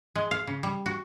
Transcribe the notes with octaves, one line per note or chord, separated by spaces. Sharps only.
G#3
F5
C#3
G3
F#4